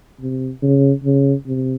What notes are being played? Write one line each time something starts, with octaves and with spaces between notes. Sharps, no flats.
C3
C#3
C#3
C3